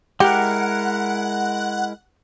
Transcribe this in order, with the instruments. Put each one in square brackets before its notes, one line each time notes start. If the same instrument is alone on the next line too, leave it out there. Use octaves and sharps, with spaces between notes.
[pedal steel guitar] G#3 E4 A#4 [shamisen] G4 [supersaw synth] F#5